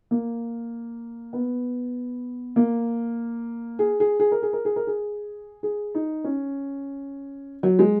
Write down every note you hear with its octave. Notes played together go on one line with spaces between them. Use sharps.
A#3
B3
A#3
G#4
G#4
G#4
A#4
G#4
A#4
G#4
A#4
G#4
G#4
D#4
C#4
F#3
G#3